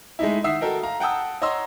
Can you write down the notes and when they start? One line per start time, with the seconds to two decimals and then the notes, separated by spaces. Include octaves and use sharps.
0.19 G#3 A3 D#4 E4
0.44 D#3 E5 F#5 D#6 E6 C7
0.61 F#4 A4 A#4 D#5 G5
0.83 F5 A#5
1.00 F#5 G5 A5 D#6 E6
1.42 C#5 D#5 F#5 A#5 C6 E6